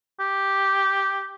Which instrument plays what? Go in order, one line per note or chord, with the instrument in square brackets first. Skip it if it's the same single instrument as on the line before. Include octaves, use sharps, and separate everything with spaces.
[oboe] G4